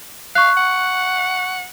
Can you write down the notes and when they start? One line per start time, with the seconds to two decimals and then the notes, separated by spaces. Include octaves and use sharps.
0.35 F5 C#6 F#6
0.57 F#5